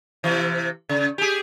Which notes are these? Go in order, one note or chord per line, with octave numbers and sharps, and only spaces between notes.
C3 E3
C#3
G4 G#4